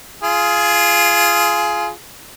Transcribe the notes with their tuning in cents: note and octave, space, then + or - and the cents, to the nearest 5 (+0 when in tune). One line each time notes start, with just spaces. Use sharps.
F4 -15 G#4 +15